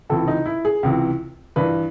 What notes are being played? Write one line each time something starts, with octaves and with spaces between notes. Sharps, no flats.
C#2 C3 E3 A4
D#4
E4
G#4
C#2 C3 E3
G2 E3 B4